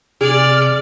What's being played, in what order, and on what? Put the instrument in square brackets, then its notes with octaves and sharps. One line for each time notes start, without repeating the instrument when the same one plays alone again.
[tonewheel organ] C3 F6 [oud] G#4 [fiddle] D5